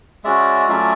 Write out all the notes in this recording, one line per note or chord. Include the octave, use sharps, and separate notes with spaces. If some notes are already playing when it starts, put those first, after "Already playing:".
G#3 C#4 F#4 D5 E5
F#3 A3 C#4 F4 D5 E5